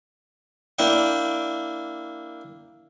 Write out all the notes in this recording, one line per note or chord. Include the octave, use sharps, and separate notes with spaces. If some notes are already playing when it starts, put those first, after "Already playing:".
A#3 D4 E4 D5 G5